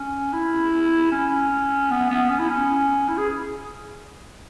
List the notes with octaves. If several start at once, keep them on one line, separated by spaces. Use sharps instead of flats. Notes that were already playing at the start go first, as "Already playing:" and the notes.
Already playing: C#4
E4
C#4
B3
B3
C#4
E4
C#4
E4
G#4